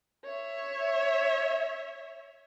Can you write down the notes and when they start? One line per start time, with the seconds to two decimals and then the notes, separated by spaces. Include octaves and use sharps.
0.25 C#5 E5